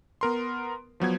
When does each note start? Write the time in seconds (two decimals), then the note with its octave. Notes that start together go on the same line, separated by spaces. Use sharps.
0.21 B3 A#4 C6
1.00 F3 F#3 B3 G#6